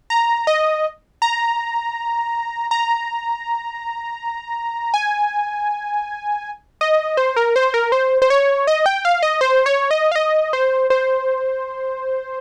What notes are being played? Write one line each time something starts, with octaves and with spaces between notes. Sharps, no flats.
A#5
D#5
A#5
A#5
G#5
D#5
C5
A#4
C5
A#4
C5
C5
C#5
D#5
G5
F5
D#5
C5
C#5
D#5
F5
D#5
C5
C5